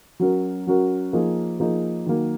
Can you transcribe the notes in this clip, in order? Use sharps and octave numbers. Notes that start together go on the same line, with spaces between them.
F#3 C#4 F#4 A#4
F#3 C#4 F#4 A#4
F3 A#3 D#4 G#4
F3 A#3 D#4 G#4
D#3 F#3 A#3